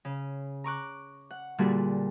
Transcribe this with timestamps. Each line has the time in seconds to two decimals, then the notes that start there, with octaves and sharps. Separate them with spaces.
0.05 C#3
0.64 A#5 C#6 D6 F#6
1.31 F#5
1.58 A#2 D3 G3 F#4 G#4